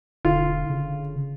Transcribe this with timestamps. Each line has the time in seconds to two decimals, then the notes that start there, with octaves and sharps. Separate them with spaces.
0.25 E1 D3 F4
0.70 C#3